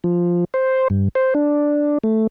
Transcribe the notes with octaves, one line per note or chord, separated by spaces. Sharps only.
F3
C5
G2
C5
D4
A3